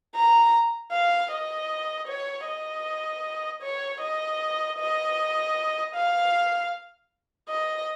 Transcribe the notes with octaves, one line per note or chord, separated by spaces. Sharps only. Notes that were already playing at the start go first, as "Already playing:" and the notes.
A#5
F5
D#5
C#5
D#5
C#5
D#5
D#5
F5
D#5